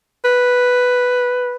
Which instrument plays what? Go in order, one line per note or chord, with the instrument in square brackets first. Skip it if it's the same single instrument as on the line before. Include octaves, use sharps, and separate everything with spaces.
[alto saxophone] B4